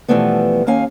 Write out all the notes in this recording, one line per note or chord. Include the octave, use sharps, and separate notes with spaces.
B2 E3 F3 G3 A3 B3
D#2 A#3 C#4 F5 G#5